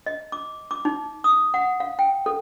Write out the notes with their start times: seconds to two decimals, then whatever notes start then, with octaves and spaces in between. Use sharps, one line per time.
0.06 D#5
0.32 D6
0.71 D6
0.85 D#4
1.24 D#6
1.54 F#5
1.80 F5
1.99 G5
2.26 A4